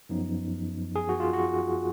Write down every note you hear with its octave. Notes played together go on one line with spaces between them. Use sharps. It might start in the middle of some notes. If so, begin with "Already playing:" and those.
F#2 F3 B3 D#4
G#4
F#4
F4
F#4